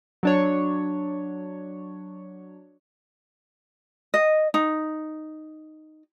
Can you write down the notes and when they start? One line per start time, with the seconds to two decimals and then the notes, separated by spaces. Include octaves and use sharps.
0.23 F#3 D4 C#5
4.14 D#5
4.54 D#4